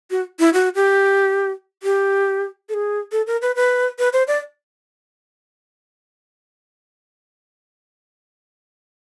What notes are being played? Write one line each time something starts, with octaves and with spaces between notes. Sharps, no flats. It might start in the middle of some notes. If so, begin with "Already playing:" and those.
F#4
E4
F#4
G4
G4
A4
G#4
A4
A#4
B4
B4
B4
C5
D5